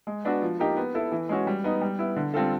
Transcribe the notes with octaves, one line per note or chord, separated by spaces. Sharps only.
G#3
B3 D4 F#4
F3
A#3 D#4 G4
B3
E4 A4
E3
G#3 C#4 F#4
G3
B3 D#4
G3
B3 E4
D3
G3 C4 F4 A4